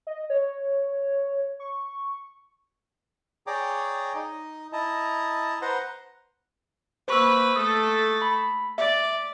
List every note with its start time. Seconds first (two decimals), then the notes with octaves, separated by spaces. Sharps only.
0.07 D#5
0.30 C#5
1.60 C#6
3.47 G#4 C#5 D5 G5 A#5 D6
4.15 D#4 D#5
4.73 E4 D#5 A5 A#5
5.62 B4 C5 F#5 A#5 C6
7.08 A#3 B4 C5 C#6 E6
7.56 A3 A4 D#6
8.22 B5
8.78 D5 E5